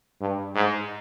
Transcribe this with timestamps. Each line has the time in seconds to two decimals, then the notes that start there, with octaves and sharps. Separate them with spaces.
0.21 G2
0.55 G#2